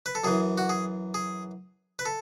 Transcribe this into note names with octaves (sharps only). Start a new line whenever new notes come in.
B4
A4
F#2 E3 G#4
F#4
G#4
G#4
B4
A4